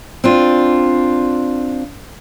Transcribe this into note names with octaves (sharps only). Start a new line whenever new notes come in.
C4 D4 F4